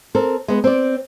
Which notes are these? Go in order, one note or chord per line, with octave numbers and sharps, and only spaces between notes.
C4 A4 A#4
G#3 B3
C4 D5